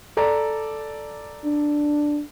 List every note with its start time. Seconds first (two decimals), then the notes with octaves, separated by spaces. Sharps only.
0.17 A4 D5 A#5
1.45 D4